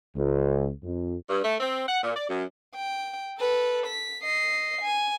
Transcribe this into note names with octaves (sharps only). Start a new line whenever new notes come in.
C#2
F2
G2
A3
C4
F#5
A#2
D5
F#2
G5
A4 B4
B6
D#5 C7
G#5